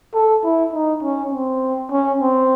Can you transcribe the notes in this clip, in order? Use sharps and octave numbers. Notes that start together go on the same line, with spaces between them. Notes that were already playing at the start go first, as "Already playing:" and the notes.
A4
E4
D#4
C#4
C4
C#4
C4